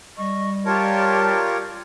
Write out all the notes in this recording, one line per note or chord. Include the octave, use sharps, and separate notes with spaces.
G3 D#5 C#6
F4 G4 A#4 C#5 D5 A5